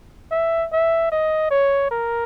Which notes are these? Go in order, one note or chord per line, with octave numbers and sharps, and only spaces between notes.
E5
E5
D#5
C#5
A#4